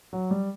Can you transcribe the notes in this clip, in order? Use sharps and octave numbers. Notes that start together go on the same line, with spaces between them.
F#3
G3